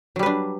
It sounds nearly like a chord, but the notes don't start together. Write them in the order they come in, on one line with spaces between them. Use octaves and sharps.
F#3 G3 B4 D4